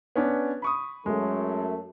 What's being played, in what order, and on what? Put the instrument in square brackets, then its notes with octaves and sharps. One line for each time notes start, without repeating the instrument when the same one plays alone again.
[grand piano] B3 C#4 D4
B5 C#6 D#6
[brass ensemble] F#2 A3 [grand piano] G#3